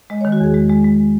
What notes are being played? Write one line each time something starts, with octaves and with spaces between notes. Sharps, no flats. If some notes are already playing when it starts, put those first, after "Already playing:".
G#3 D#5
D#3 C#5
F#4
E2 G#4
G#3
G#3
G#3